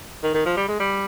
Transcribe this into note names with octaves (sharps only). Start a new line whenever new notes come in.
D#3
D#3
F3
G3
G#3
G3